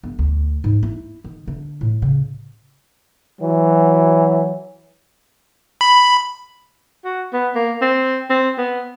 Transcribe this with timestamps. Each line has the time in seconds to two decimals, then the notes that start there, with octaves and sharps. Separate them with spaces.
0.03 G1
0.19 D2
0.64 G#2
0.83 E4
1.24 D#3
1.47 D3
1.81 A2
2.02 C#3
3.40 E3 F#3
5.81 B5
7.05 F#4
7.33 B3
7.55 A#3
7.81 C4
8.30 C4
8.58 B3